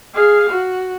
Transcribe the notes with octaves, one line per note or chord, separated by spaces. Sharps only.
G#4 F5
F#4